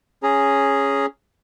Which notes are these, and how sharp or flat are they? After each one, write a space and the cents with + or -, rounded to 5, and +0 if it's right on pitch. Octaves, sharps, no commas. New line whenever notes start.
C#4 +0 G#4 +0 A#5 +0